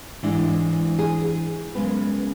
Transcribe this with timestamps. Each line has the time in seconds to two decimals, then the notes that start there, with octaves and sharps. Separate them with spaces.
0.23 G#2 E3 G#3 D4 E4
0.99 G#4
1.75 F#2 C#3 G#3 B3 B4